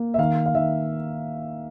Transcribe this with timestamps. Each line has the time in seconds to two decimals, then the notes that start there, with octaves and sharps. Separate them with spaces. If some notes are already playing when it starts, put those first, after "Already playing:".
Already playing: A#3
0.14 E5
0.18 D#3 F5
0.46 F5
0.54 D#3 E5